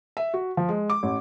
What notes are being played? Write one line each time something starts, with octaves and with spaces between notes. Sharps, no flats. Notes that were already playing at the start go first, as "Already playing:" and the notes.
E5
F#4
F3
G#3
D6
A1